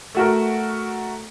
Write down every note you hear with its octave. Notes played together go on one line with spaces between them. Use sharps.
A3 F#4 A#4